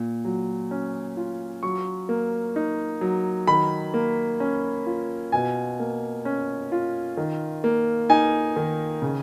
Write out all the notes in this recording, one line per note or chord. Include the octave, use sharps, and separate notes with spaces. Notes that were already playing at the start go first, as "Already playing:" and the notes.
Already playing: A#2
F#3
C#4
F4
F#3 C#6
A#3
D#4
F#3
D#3 B5
A#3
C#4
F4
B2 G#5
A#3
C#4
F4
D#3
A#3
D#4 G#5
D#3
C#3